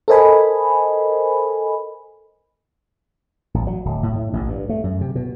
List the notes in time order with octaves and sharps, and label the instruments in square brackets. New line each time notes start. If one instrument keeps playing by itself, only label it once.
[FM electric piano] A4 A#4 C5 D#5 G#5 B5
[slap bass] A1
F#3
D1
A2
A2
A1
G2
A3
F#2
C3
B2